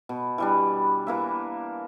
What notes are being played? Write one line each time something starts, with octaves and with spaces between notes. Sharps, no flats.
B2
E3 G3 D4
E3 A#3 E5